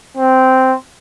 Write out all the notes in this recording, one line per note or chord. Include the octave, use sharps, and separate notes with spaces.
C4